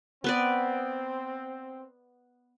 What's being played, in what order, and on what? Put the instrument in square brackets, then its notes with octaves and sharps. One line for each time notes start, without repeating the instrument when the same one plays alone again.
[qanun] B3 B4 D5 [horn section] C4